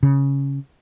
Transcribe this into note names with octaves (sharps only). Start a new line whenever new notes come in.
C#3